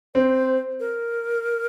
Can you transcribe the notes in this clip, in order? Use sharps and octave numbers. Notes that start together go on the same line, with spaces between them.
C4 C5
A#4